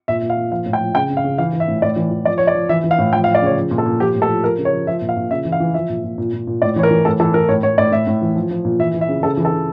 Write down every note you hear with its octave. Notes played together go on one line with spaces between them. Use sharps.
A#2 E5
A#2
F5
A#2
F3 F5
A2
G5
F3
C#3 G5
C#3
F5
C#3
E3 F5
E3
E5
A2
A2 D5
E3
E3
F3 D5
F3 C#5
D5
F3
E3 E5
E3
F5
A2
F3 G5
F5
F3
D5
C#3 C#5
F3
A#2
A4
A#2
F3 G4
A2
A4
F3
F3 A#4
C#3
C#5
F3
F3 E5
A#2
F5
A#2
C#3 E5
E3
F5
E3
F3 E5
A#2
A#2
A#2
A#2
A#2
A2 D5
E3 C#5
A#4
E3
A2 A4
E3 A4
E3 A#4
A2 C#5
A2 C#5
A2 D5
A2 E5
A2
E3
F3
F3
A#2
E3 E5
E3
E5
C#3
C#3 A4
E3
A4
C#3